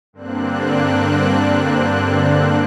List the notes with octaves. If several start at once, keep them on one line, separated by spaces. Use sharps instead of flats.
G2 D3 A#3 C4 D4 F#6